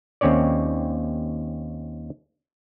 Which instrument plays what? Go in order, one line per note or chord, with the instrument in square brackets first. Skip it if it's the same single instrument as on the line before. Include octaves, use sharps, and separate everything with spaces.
[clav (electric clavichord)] D#2 C4 C#4 C#5 D5